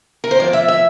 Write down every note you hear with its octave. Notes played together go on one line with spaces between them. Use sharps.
A#4
C5
A2 F3 D5
E5
E5